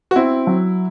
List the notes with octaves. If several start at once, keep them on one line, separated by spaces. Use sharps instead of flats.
F#4
C4 E4
F#3